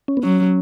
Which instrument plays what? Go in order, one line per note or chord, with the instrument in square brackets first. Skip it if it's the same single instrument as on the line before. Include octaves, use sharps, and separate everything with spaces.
[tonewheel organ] C#4
B3
[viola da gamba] F#3 [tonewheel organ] C#4